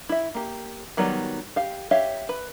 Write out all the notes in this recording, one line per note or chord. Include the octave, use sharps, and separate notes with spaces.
E4 E5
A#3 G4
D#3 F#3 G3 B3
G4 F5
G4 C#5 E5 F5
B4